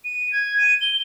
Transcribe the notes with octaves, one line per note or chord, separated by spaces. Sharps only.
D#7
G#6
D#7
G7